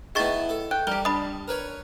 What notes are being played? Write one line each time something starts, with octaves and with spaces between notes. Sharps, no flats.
D#3 B3 E4 G#4 A5 C#6 A6
A4
G5 F#6
G3 G4 A#4 G7
D4 B5 D#6
A#4 B4 C#5